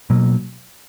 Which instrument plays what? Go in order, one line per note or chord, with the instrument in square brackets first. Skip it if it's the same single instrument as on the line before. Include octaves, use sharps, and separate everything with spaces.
[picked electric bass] B2 F#3 A#3